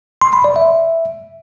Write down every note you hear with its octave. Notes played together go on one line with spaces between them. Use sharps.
C6
B5
D5
E5